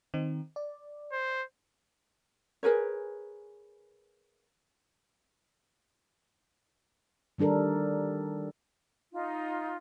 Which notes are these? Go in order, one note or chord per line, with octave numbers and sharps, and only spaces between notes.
D#3 C4 D#4
D5
C5
G#4 A#4 B4 C#5
D#3 G3 D4 A4 A#4
D#4 F4